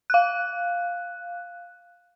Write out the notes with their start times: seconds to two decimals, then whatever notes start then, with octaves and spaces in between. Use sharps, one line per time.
0.10 F5 F#6